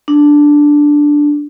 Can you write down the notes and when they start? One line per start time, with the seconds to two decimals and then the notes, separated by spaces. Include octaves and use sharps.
0.08 D4